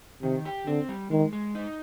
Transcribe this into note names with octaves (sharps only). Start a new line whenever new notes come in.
C3 D#3
G4
D3 C4
G3
D#3 G#3
G#3
D#4